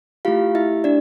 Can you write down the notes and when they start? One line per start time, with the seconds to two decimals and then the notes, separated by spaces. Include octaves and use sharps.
0.25 A3 E4 F4 G4 F5
0.55 E4 E5
0.84 D4 D5